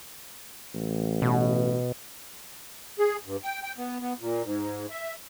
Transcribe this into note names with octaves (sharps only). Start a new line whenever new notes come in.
A1
B2
G#4
G2
G5
G5
B3
B3
A#2
G#2
E5